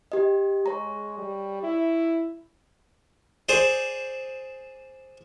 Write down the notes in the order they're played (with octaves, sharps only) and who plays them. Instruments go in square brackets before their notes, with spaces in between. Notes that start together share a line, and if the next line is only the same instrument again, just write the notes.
[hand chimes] G4 D#5
[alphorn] G#3 [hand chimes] C#5 A#5
[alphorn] G3
E4
[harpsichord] G#4 C5 D5